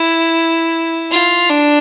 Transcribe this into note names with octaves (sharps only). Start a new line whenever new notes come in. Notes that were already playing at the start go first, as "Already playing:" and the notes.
Already playing: E4
F4
D4